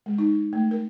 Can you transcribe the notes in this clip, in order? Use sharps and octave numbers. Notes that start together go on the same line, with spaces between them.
G#3
D#4
A3
A#4